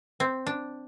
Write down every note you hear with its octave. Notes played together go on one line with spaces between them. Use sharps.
C4
D4